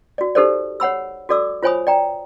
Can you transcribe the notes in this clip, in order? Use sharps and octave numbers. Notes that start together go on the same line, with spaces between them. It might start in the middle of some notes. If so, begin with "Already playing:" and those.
F#4 D5
D#4 G4 A4 A#4 C5 D5
C#5 F#5 B5 E6
F#4 A4 D5 D6 E6
F4 C5 C#5 G#5 B5 D#6
D5 G5 A#5